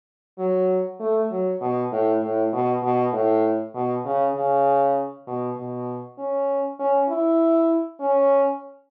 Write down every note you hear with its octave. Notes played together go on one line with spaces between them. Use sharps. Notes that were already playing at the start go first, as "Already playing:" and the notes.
F#3
A3
F#3
B2
A2
A2
B2
B2
A2
B2
C#3
C#3
B2
B2
C#4
C#4
E4
C#4